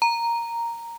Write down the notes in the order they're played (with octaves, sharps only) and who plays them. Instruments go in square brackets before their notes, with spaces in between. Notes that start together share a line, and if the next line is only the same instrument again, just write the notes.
[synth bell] A#5